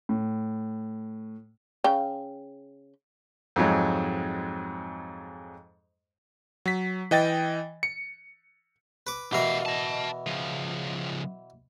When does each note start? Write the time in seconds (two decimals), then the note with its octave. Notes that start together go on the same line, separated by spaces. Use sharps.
0.09 A2
1.84 C#3 G5
3.56 F2 G#2 F#3 G#3
6.66 F#3 B6
7.11 E3 D#5 G5 A6
7.83 C#7
9.07 B4 D6
9.33 B2 E3 G4 A#4 F5
9.66 D#5 A5
10.27 C#3 F3